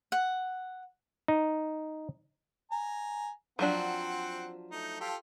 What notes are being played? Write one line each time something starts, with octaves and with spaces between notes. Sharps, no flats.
F#5
D#4
G#5 A#5
F3 F#3 C4 D4 F#5
A3 D#4
F4 G4 A4